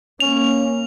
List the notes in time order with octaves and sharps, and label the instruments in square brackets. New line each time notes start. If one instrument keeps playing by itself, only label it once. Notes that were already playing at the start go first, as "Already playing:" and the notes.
[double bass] A#3 [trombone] C#4 [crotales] F7